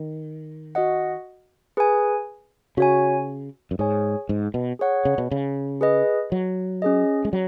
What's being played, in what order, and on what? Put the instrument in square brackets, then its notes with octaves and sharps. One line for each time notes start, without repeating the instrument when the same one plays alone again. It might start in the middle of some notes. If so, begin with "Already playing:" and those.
Already playing: [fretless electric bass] D#3
[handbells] F#4 D#5 F#5
G#4 B4 G#5
[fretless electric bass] C#3 [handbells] F#4 C#5 G#5
[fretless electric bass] F#2
[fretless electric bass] G#2 [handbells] G#4 C#5 G#5
[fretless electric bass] G#2
B2
[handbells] G#4 C#5 F#5
[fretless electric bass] C#3
B2
C#3
[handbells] G#4 B4 D#5
[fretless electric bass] F#3
[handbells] C#4 G#4 D#5
[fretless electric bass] G#3
F#3